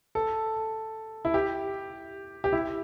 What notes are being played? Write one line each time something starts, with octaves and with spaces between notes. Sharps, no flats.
A4
E4
G4
G4
E4